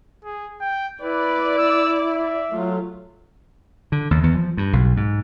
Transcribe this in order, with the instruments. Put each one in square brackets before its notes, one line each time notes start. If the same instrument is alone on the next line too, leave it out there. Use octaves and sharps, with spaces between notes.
[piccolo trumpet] G#4
G5
[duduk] E4 [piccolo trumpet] B4 [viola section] D5
[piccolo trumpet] E6
E5
[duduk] F#3 [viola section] A3 F4
[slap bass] D3
D#2
E2
F3
G2
B1
G#2